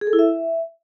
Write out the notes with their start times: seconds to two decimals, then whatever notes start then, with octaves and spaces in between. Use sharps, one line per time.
0.01 G#4
0.07 A4
0.13 E4
0.19 E5